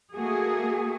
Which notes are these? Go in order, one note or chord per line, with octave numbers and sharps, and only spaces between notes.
A3 A#3 F#4 G#4